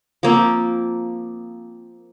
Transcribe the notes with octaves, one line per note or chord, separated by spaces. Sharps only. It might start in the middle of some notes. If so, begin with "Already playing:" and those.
F3 A#3 C4